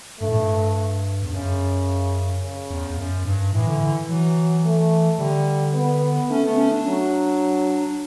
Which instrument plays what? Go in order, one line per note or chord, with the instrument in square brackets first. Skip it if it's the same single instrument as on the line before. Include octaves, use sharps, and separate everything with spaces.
[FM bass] G2 [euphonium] A3
[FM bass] A2
G2
E2
[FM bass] F#2 [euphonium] C#3
[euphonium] C#3
[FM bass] E2
E2
F#2
G2
[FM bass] A2 [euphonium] E3
[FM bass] D3
D3
[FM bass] E3 [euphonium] F#3
[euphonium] A3
[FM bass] D3 [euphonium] G3
[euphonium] B3
[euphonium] A3 [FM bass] C#4
[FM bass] B3
C#4
D4
[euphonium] F#3